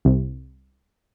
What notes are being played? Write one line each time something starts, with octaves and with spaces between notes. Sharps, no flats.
C2